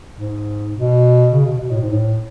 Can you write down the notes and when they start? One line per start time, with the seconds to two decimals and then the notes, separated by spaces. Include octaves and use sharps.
0.17 G#2
0.74 B2
1.32 C#3
1.45 B2
1.60 B2
1.71 A2
1.81 G#2
1.93 A2